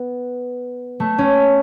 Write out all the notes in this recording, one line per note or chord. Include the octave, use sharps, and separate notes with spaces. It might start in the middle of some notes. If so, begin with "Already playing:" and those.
Already playing: B3
A3
C#4